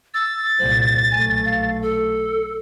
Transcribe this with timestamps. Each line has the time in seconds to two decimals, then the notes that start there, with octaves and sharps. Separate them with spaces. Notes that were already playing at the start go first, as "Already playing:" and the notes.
0.14 E6 A6
0.59 C2 A#2 C5
1.11 B1 A3 G#5
1.45 F5
1.82 A4